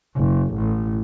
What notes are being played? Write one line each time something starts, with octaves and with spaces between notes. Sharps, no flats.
F#1
A1